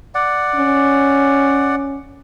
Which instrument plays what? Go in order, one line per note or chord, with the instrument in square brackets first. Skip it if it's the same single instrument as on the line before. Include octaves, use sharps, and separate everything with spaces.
[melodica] D5 F#5
[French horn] C#4